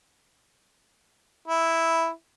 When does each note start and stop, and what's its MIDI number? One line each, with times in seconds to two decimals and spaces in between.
1.48 2.10 64